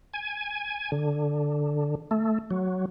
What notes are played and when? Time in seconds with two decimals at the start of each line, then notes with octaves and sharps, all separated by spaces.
0.14 G#5
0.92 D3
2.11 A3
2.51 F#3